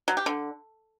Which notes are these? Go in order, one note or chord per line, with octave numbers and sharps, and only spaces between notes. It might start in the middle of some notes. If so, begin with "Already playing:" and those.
F#3
G4
D3